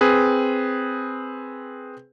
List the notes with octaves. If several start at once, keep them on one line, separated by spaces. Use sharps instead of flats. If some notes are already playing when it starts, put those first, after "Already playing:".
C4 G#4 B4